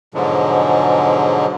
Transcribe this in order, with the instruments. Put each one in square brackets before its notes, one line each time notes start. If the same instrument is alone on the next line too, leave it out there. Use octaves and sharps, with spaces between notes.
[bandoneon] G#2 B2 D3 F3 F#3 G#3